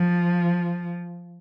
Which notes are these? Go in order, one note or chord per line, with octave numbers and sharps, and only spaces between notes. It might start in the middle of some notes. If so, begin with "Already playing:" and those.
Already playing: F3